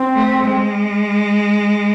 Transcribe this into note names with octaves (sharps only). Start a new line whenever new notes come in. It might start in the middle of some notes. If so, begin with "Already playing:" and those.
Already playing: C4
A3
G#3